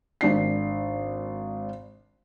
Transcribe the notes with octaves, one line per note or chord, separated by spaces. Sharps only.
G#1 D4 C7